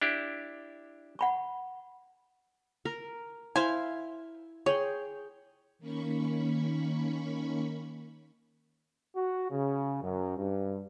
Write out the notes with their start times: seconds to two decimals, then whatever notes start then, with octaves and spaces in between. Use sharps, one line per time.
0.02 D4 E4 G4
1.19 F#5 B5 C#6
2.85 A#4
3.56 E4 C5 F5 G#5 C6
4.66 G#4 C#5 G5 C6
5.79 D#3 A#3 C#4 B5 C#6
9.15 F#4
9.50 C#3
10.01 F#2
10.36 G2